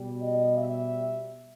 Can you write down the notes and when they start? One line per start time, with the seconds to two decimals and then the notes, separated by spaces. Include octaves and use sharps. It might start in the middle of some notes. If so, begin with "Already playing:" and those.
Already playing: B2 G3
0.22 D#5
0.58 E5